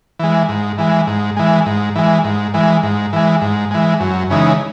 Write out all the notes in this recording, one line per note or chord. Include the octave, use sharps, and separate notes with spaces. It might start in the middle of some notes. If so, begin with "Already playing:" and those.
E3 G#3
G#2
E3 G#3
G#2
E3 G#3
G#2
E3 G#3
G#2
E3 G#3
G#2
E3 G#3
G#2
E3 G#3
F#2
C#3 E3 G#3 D#4